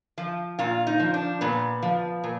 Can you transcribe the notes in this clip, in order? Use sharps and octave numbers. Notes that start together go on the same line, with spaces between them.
F3
A#2 F4
D#4
F3
D4
A#2 B3
F3
A#2